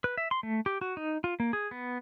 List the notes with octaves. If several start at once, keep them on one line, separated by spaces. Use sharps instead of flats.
B4
E5
C6
A3
G4
F#4
D#4
F4
A#3
G#4
B3